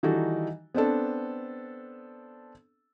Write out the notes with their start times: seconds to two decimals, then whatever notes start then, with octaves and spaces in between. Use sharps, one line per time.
0.03 D#3 E3 G3 D#4 F#4 A4
0.74 B3 C4 D4 A4